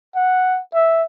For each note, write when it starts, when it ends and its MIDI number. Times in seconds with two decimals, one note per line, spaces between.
0.16 0.60 78
0.74 1.04 76